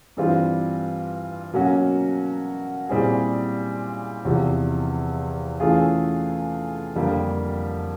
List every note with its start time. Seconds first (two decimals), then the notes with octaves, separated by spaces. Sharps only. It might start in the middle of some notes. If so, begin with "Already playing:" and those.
0.17 G2 E3 G3 C4 F4
1.53 B2 F#3 A#3 C#4 F#4
2.89 A#2 G3 C4 E4 G#4
4.25 E2 C3 F3
5.60 E3 A3 C#4 F4 G#4
6.96 F2 D3 G3 A#3